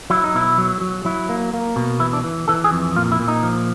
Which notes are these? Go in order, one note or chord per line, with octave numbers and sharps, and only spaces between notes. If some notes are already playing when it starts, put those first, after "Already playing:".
F#3 E4
D#4
B2 E4
F#3
F#3
F#3 E4
A#3
A#3
B2
E3 E4
D4
E3
E3 A4
G#4
F2
A#2 F4
E4
A#2
D#4
F3